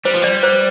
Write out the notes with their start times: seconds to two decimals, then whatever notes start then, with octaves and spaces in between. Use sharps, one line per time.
0.05 G3 C5
0.14 F3
0.22 G3 D5
0.43 C5